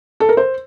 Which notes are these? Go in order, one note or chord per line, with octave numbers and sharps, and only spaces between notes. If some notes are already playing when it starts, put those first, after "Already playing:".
A4
A#4
C5